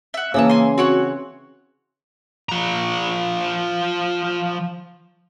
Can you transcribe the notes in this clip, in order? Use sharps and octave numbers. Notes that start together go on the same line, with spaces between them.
E5 F#5
C#3 E3 A#3 A5 D#6 E6
G#5 C6
C4 F#4 C#5 F#5
F3 A#5